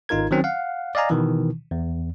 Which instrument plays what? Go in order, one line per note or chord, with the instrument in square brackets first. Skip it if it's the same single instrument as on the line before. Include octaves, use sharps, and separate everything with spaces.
[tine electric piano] G#1 D#4 F4 A#4 G#6
D#3 F#3 C4 C#4
F5 F#5
D5 D#5 F5 G#5 A#5
B2 D#3 E3
E2